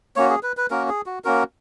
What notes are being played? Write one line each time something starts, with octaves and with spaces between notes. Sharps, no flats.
A#3 C#4 F#4 C#5
G#4
B4
B4
A#3 C#4 F#4 A#4
G#4
F#4
A#3 C#4 F#4 A#4